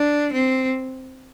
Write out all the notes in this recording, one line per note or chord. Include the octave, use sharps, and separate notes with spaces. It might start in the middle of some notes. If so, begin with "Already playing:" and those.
Already playing: D4
C4